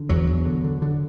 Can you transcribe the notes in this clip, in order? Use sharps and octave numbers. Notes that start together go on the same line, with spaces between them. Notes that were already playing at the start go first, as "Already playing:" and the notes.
Already playing: D3
E2 F#3
E2
D3
D3
D3